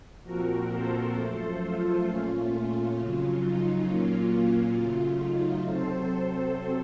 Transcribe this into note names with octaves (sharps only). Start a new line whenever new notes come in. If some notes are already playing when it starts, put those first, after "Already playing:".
A#2 F3 C4 F#4 A#4
A4 C5
F#2 F3 A3 A4 C5
F4 A4
A#2 A3 C#4 F4
F4
F2 C#3 F#3
D#4
A#2 F#3 A#3 C#4 F4
F#2 C#3 F#3 A3
D#4
C3 F#3 C4 A4 C5
A4 C5